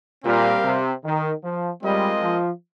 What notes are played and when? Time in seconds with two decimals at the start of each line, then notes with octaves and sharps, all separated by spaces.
0.25 A#2 G3 C4 G4 A#4 F5
0.64 C3
1.04 D#3
1.43 F3
1.83 G3 G#3 C4 F4 A#4 D#5
2.22 F3